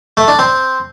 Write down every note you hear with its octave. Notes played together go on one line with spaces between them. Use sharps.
A3
D4
C4